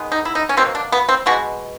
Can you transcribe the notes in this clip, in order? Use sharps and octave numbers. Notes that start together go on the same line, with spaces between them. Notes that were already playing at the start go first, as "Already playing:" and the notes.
Already playing: D#3 G#3 B3
D#4
E4
D#4
C#4
B2 F#3 A#3 C4
D4
B3
C4
B2 G#3 B3 F#4